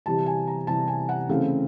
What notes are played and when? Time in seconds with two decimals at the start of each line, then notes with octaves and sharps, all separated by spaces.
0.06 C3 E3 G3 A5
0.26 G#5
0.47 A#5
0.67 C3 E3 G3 A5
0.87 G#5
1.09 F#5
1.29 C#3 E3 A3 C4 F5